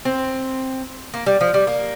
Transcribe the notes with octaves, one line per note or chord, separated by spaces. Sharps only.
C4
A#3
G3
F3
G3
A#3